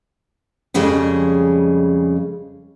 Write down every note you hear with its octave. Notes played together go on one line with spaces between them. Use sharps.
F2 C#3 G3 G#3 G#4